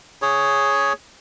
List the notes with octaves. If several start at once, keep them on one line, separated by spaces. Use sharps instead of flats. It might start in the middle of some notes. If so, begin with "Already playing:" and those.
G#4 C#5